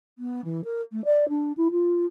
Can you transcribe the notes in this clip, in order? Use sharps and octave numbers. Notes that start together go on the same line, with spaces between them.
B3
E3
A#4
A3
D5
D4
E4
F4